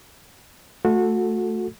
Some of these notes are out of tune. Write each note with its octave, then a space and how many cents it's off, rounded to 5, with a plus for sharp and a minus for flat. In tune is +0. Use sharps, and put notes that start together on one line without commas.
A3 +0 F#4 -25 A4 +0